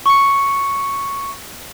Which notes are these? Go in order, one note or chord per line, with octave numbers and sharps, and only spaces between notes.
C#6 C#7